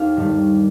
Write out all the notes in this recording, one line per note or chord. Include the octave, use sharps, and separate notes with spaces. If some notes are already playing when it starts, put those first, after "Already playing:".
Already playing: D#2 F5
G2 D#3 G3